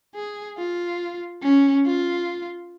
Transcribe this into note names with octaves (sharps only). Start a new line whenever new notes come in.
G#4
F4
C#4
F4